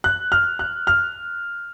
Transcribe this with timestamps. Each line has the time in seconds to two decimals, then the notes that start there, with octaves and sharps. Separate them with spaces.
0.04 F#6
0.32 F6
0.59 F#6
0.87 F6